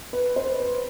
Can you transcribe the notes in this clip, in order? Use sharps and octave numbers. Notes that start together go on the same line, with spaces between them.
B4
C5
B4